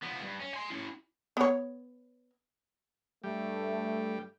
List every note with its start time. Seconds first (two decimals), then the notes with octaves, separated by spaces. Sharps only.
0.03 F3 B3
0.22 G2
0.40 C#4
0.54 G#5 C6
0.70 C#4 E4
1.37 B3 C#5
3.24 G2 G3 A3